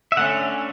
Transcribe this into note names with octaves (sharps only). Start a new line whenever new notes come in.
E5
D3 A3 C#4 F#5